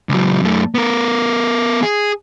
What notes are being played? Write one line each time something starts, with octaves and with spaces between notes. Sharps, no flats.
C#2 F#3
F#2 A3
B3 A#4
G#4